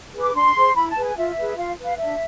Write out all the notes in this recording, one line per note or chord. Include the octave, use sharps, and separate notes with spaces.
G#4 B4
D6
D4 C6
G#4 C5
E4 B5
A5
G#4 B4
G#5
F4 E5
G#4 B4
F4 F5
B4
F5
D4 E5